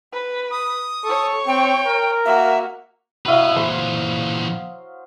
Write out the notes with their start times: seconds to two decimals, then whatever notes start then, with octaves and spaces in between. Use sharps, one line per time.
0.13 B4
0.51 D#6
1.05 A4 C#5 C#6
1.48 C4 G5
1.86 A#4
2.25 A#3 F#4 E5
3.26 F#3 E4 B4 D#5 F5
3.56 A#2 E3 C5 C6 D#6